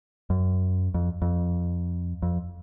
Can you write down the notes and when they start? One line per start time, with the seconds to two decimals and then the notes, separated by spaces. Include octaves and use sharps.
0.30 F#2
0.94 F2
1.22 F2
2.22 F2